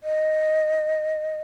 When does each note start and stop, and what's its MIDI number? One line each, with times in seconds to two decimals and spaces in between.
0.03 1.42 75